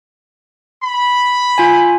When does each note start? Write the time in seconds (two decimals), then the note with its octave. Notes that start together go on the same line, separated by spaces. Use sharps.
0.82 B5
1.58 F4 G#5